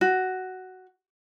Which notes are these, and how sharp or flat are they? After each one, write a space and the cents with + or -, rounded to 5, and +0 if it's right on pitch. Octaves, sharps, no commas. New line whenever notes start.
F#4 +10